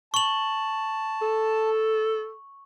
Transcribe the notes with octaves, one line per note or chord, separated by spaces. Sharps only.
A5 C#6 F#7
A4